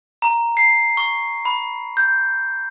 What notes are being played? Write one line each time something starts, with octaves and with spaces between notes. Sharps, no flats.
A#5
C7
C#6
B5
G6